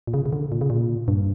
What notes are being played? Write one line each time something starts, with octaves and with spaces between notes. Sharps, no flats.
A#2
C#3
C#3
D3
A#2
C#3
A#2
G2